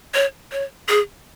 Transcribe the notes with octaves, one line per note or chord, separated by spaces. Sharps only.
C#5
C#5
G#4